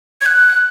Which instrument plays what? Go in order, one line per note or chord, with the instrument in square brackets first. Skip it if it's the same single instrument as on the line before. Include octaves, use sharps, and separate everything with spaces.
[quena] G#6
F#6